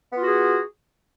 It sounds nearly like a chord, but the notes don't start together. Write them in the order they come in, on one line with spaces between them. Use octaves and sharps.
B3 F4 F#4 G#4